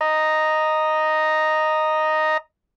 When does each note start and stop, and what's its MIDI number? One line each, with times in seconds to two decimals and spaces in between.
0.01 2.37 75
0.01 2.37 82